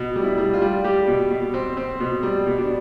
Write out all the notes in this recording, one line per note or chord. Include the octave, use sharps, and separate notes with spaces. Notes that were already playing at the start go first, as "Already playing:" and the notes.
Already playing: B2
G3
E4
G3
F4
G3
G3 G4
B2
B2
C4
C4
B2
G3
B2
D4